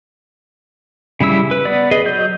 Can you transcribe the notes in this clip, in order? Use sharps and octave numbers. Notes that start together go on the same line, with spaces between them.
C#3 G3 E4 E6
B4
B3 D5
G#4 B4 D#5
F#3 D#5 G6